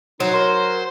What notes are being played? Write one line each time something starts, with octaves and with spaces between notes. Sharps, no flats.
F#3 D#4 C5 F#5
A#4 C6